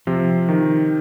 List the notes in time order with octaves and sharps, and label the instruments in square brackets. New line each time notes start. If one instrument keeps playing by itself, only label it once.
[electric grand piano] C3 [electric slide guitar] F3
[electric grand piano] D#3